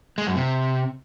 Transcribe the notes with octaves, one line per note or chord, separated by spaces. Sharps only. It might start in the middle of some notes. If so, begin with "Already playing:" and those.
G#3
F#2
C3